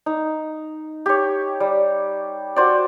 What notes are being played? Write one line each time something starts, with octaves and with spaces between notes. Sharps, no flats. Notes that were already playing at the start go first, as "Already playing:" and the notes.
D#4
G4 C#5
G3
F#4 C5 D5